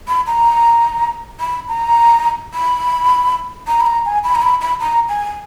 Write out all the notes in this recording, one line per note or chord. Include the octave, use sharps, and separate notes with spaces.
B5
A#5
B5
A#5
B5
A#5
B5
A#5
G#5
B5
A#5
B5
B5
A#5
G#5